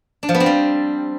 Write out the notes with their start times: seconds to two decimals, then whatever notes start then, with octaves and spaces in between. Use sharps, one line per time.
0.23 D4
0.29 F3
0.34 B3
0.40 C4
0.46 G3